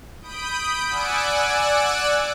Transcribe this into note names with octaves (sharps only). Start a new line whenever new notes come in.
B5 D#6 G6 D7
D5 F#5 G#5 E6 F#6 D7